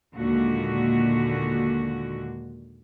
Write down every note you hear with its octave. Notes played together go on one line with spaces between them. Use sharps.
D#2 A#2 D3 G#3 F#4